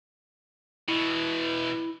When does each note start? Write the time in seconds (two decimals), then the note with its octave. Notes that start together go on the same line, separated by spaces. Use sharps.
0.88 B2 E3 E4